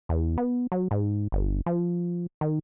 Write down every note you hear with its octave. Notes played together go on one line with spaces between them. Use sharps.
E2
B3
F#3
G#2
G1
F3
D#3